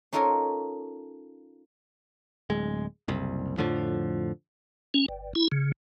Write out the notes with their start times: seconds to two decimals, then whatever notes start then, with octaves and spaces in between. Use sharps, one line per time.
0.13 C#4 D#4 F4 A4 A#4 C#5
2.50 D1 G#3
3.08 F#1 C2
3.58 F2 A2 D3 F3
4.94 C#4
5.08 G1
5.35 E4
5.52 C#3